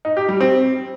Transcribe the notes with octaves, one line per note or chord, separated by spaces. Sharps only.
D#4
G4
G3
C4